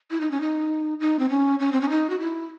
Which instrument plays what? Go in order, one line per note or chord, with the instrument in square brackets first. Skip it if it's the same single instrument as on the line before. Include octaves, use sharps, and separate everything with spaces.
[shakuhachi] E4
D#4
C#4
D#4
D#4
C4
C#4
C#4
C4
C#4
D#4
F#4
E4